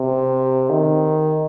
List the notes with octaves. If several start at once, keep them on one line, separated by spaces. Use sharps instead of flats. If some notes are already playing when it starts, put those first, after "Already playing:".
Already playing: C3
D#3